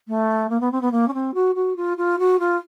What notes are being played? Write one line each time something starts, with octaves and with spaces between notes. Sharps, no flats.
A3
A#3
B3
C4
B3
A#3
C#4
C4
F#4
F#4
F4
F4
F#4
F4